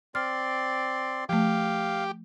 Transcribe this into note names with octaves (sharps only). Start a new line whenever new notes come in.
C4 D5 C6 F6
F3 A3 G4 F5